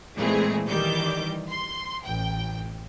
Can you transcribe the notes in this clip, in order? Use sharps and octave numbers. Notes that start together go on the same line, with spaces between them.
A#2 E3 G#3 A3 C4 G#4
D#3 E3 G3 D6 G6
C6
A1 G5